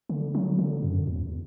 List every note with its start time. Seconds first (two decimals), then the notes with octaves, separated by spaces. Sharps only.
0.09 D3
0.35 F#3
0.59 D3
0.83 F#2
1.07 E2